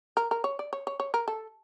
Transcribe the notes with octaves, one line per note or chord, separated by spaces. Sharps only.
A#4
A#4
C#5
D5
C#5
C#5
C#5
A#4
A4